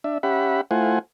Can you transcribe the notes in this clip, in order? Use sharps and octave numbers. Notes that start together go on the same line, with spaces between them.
D4 E5
C#4 G4 E5 F#5 B5
A3 E4 F4 C5 F#5 G#5